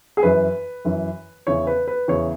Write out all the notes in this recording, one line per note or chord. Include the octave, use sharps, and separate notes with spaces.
G#4
F#2 E3 B4
F#2 E3
E2 C#3 E3 C#5
B4
B4
E2 C#3 E3 C#5